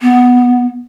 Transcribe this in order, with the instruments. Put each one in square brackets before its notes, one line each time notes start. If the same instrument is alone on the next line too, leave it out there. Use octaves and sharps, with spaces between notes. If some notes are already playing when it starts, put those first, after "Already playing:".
[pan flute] B3